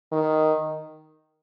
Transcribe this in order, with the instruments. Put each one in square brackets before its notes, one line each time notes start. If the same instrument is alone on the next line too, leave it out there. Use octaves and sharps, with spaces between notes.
[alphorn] D#3